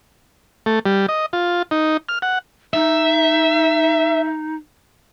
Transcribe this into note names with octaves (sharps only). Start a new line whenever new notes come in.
A3
G3
D#5
F4
D#4
F6
F#5
D#4 E5